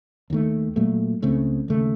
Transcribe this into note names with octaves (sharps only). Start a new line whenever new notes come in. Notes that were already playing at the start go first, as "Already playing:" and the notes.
D#2 D#3 A3
A#2 F#3 A3
C#2 C#3 A3 C4
D#2 C#3 A3